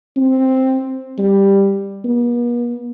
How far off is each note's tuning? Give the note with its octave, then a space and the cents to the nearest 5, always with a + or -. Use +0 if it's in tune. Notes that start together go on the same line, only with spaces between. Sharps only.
C4 +5
G3 +5
B3 -45